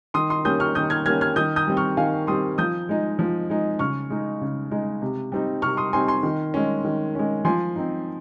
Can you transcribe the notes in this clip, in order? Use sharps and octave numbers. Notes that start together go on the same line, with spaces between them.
D#3 C6 D#6
C6 D#6
G3 A#3 C#4 D#6 G6
C#6 F6
D#3 D#6 G6
F6 G#6
G3 A#3 C#4 F6 G#6
F6 G#6
D#3 D#6 G6
D#6 G6
G3 C4
C#6 F6
D#3 F5 G#5
G3 C4 C6 D#6
F3 D#6 G6
G#3 D#4
F3
G#3 D#4
C#3 C#6 F6
G#3 D#4
C#3
G#3 D#4
C3
G3 C4 D#4
C3 C#6 F6
C6 D#6
G3 C4 D#4 G#5 C6
G#5 C6
D#3
G#3 C#4
D#3
G#3 C#4
F3 G#5 C6
C4 D#4